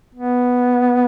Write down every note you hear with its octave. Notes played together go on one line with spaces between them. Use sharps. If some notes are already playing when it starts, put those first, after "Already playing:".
B3